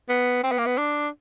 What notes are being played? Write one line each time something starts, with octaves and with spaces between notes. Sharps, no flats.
B3
C4
B3
A#3
B3
D4